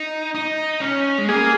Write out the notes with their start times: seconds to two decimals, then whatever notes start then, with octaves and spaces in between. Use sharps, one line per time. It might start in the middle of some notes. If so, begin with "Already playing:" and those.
Already playing: D#4
0.35 D#4
0.81 C#4
1.18 G#3
1.28 A#3 G#4